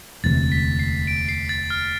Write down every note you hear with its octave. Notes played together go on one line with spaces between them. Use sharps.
E1 D2 C3 E3 A6
B6
C7
D7
C7
A6
F6